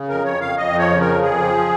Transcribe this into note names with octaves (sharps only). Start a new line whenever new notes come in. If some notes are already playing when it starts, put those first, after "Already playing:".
Already playing: C#3
F2 A#4
F2 C#5
F2 F5
F2 D#5
F3
C#5
C#3
F2 A#4
F2 G#4
F3